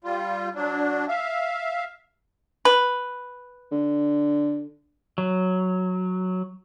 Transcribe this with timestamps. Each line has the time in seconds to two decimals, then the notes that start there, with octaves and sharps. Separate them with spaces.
0.04 G3 F4
0.55 F#3 D4
1.08 E5 F5
2.65 B4
3.71 D3
5.18 F#3